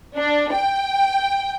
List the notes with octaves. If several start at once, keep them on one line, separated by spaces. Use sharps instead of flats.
D4
G5